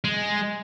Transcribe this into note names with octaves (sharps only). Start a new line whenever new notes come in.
G#3